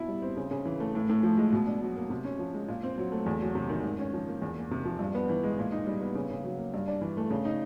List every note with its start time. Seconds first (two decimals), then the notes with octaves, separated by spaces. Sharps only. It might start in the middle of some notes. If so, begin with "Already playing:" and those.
Already playing: B2 E4
0.08 G3
0.22 C4
0.37 C#3
0.51 C#3
0.65 E3
0.80 A3
0.95 A2
1.10 A2
1.23 F3
1.38 G#3
1.52 B2
1.67 D4
1.82 F#3
1.96 A#3
2.10 C3
2.25 C#4
2.39 F3
2.54 G#3
2.68 A#2
2.83 C4
2.98 F#3
3.12 A3
3.26 E2
3.41 F#3
3.55 C3
3.69 D#3
3.83 G#2
3.98 C#4
4.13 F3
4.28 A#3
4.42 E2
4.56 A#3
4.71 C3
4.85 F3
4.99 G2
5.15 B3
5.29 E3
5.44 G#3
5.58 A#2
5.72 D#4
5.87 G3
6.01 B3
6.15 C#3
6.30 C#3
6.44 F#3
6.58 A#3
6.74 G2
6.88 D4
7.01 E3
7.17 A3
7.30 C#3
7.45 D#4